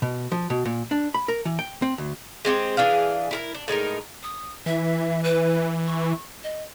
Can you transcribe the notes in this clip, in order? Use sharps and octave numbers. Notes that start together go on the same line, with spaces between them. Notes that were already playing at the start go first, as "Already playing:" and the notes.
B2
F3
B2
A#2
D4
B5
A#4
E3
G5
C4
D2
G#3 C4 F#4 G4
E3 D4 G#4 F5
E4 G#4 A#4
D4
A2 G#3 D#4 A#4
D#6
E3 E5
B4
C#6
D#5